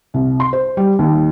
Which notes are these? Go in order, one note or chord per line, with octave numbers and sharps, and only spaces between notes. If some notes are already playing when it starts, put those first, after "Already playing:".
C2
C6
C5
G3
D#2